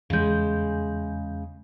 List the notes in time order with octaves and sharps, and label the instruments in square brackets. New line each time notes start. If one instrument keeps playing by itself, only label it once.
[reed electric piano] E2 G6 [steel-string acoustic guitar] C#3 G#3